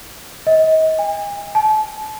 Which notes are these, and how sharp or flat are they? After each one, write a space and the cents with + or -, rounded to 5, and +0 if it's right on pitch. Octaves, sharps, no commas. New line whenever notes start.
D#5 +35
G#5 -40
A5 -30